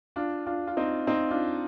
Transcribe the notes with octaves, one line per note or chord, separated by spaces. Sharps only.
D4 F4
D4 F4
F4
C4 D#4
C4 D#4
D4 F4